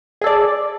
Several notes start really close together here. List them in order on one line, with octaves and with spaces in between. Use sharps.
G#4 A4 D5